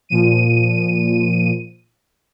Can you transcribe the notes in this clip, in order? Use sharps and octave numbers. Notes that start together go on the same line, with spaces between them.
A#2 F3 D#7